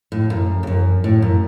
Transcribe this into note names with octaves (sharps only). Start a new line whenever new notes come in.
A2
F#2
F2
F#2
A2
F#2